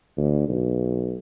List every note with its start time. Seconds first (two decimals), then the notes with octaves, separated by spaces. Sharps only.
0.17 D2
0.48 B1